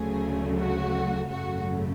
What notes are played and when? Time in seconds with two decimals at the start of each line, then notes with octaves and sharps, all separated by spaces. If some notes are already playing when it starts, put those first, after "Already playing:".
Already playing: D2 C#3 F#3 A3 G#4
0.57 F#4
1.30 G#1 F#2 C#3 F#3 A3 F#4